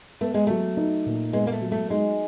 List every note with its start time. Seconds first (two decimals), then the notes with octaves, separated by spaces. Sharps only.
0.21 A3 B3
0.34 G#3
0.47 F#3 A3
0.77 D#4
1.06 A#2
1.33 G#3 B3
1.47 A#3
1.52 A3
1.61 F#3
1.72 A3
1.90 G#3 D#4